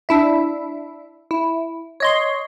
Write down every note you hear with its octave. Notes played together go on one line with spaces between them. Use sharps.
D4 E4 E5
E4
C#5 D#5 C6